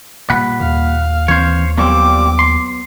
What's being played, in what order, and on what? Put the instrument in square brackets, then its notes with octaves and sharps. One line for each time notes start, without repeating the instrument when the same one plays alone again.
[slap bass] A#2 G3 [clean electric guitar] F#5 B5
[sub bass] D#2 [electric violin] F5
[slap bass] E3 C4 [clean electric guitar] C5 C#5
[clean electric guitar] A#2 G3 C4 [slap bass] F#3 B3 [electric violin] D6
[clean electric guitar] C6